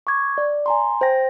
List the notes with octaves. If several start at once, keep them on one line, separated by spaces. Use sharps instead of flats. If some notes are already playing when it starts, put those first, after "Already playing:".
C#6 D6 G#6
D5
G#5 A#5 C6
C5 G5 A#6